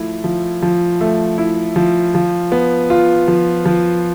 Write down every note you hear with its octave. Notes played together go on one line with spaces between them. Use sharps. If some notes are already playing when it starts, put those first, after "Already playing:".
Already playing: F3 A3 E4
F3
F3
A3
E4
F3
F3
B3
F4
F3
F3